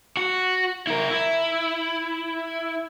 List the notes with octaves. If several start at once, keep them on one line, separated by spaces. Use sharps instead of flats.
F#4
E4 A#4
E4